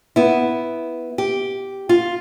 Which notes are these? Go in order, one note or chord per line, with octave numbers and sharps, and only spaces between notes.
B3 E4
G4
F4